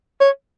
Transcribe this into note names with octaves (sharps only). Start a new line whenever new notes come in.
C#5